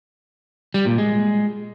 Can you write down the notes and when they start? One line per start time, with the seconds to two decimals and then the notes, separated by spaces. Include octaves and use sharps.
0.74 G3
0.86 A#2
0.98 G#3